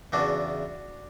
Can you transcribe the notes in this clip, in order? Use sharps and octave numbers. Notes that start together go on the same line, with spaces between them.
E2 C#3 E3 D4 F#4